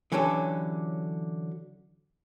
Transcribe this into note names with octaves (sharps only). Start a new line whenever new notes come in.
D3 E3 F#3 C#4 G4 A4